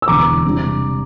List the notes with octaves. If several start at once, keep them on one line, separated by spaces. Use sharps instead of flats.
E6
E1 E2 D3 A#5 D6
C3 G3 D4